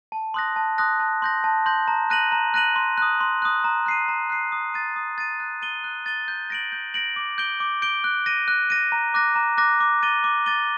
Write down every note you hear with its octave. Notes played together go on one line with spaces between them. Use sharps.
A5
C6 D#6 F#6 A#6
A5
C6 D#6 F#6 A#6
A5
C6 G6 A#6
A5
C6 G6 A#6
A#5
F#6 A#6 D#7 F#7
A#5
F#6 A#6 D#7 F#7
C6
D#6 F#6
C6
D#6 F#6
A#5
F#6 C7 D#7
A#5
F#6 C7 D#7
D#6
A6 D#7
D#6
A6 D#7
F#6
A6 D#7 G7
F#6
A6 D#7 G7
G6
A#6 D7 F#7
G6
A#6 D7 F#7
D6
G6 D7 G7
D6
G6 D7 G7
F#6
A#6 D#7
F#6
A#6 D#7
A#5
D6 F#6 A#6
A#5
D6 F#6 A#6
D6
A6 D#7 G7
D6
A6 D#7 G7